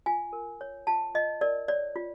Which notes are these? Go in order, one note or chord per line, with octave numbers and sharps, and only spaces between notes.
F4 G#5
A#4
C#5
F4 A5
F4 D#5
A#4 D5
C#5 D5
F4